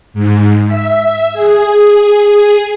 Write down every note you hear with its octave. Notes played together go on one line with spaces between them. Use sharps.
G#2
E5
G#4